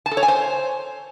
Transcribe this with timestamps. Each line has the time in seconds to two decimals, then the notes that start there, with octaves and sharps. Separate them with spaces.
0.06 A5
0.11 A4
0.17 C#5
0.23 G#5
0.28 C5